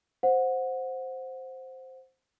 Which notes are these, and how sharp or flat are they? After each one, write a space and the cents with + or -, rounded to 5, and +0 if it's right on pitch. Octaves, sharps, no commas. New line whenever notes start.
C5 +0 F#5 -20